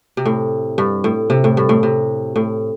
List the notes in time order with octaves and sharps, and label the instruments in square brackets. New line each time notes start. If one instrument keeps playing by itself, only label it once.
[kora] C3
A2
G2
A2
C3
A2
G2
A2
C3
A2